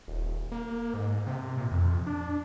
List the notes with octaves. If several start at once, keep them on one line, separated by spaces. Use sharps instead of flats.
D#1
A#3
G#2
C3
A#2
F2
D4